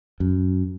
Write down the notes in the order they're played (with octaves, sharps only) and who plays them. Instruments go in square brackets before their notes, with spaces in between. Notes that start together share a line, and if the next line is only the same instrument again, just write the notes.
[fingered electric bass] F#2